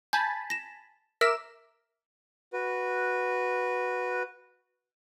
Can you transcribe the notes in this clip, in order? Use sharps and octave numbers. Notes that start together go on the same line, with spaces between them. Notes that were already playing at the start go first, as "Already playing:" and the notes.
G#5 A5 B5 G6
A#6 E7
A#4 E5 D6 E6 B6 E7
F#4 B4